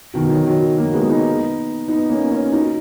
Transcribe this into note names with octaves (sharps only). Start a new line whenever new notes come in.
B2 D#3
D#3 F#3
D#3 F#3
F#3 A#3
G#3 B3
B3 D#4
B3 D#4
A#3 C#4
C#4 F4
D#4 F#4